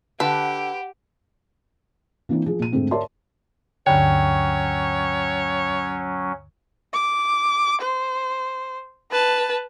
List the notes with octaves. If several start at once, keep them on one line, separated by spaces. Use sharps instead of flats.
D3 G4 B4 F#5 A5
E3 A#3 C4 D4 E4
F3 G#4
A#2 D#7
F2 G#2 D3 A3 C4
A#4 C#5 D5 E5 A5 C6
D2 G2 D3 F#3 C#4 C#5 G5
D6
C5
B4 A5